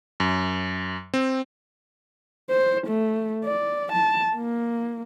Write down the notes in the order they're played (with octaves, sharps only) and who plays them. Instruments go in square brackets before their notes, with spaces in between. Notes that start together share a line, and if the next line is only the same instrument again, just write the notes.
[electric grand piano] F#2
C4
[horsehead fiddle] C5
A3
D5
A5
A#3